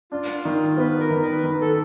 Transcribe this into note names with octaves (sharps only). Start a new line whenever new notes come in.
D4 F4
D#3
B3 B4
A#4
D#3
B4
D#3
A4